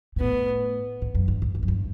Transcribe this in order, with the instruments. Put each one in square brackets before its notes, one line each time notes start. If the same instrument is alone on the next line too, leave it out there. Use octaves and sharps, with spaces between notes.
[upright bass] A#2
[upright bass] A2 [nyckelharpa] B3
[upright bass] G#2
F#2
G2
G#2
G#2
F#2
G2